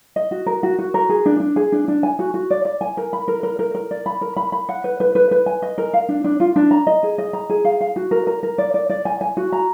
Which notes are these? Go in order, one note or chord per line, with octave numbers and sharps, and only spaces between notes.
D#5
F#4
A#4
F#4
F#4
A#4
G#4
D4
D4
G#4
D4
D4
G#5
F#4
F#4
D5
D5
G#5
A#4
B5
A#4
A#4
A#4
A#4
D5
B5
A#4
B5
B5
F#5
B4
B4
B4
B4
G#5
D#5
A#4
F5
D4
D4
F4
D4
A#5
D#5
G#4
D#5
A#5
G#4
F5
F5
F#4
A#4
A#4
A#4
D5
D5
D5
G#5
G#5
F#4
A#5